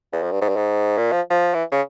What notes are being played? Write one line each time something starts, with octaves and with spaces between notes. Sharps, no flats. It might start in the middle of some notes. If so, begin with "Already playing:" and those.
E2
F2
G2
G#2
G2
G#2
A#2
F3
F3
E3
C#3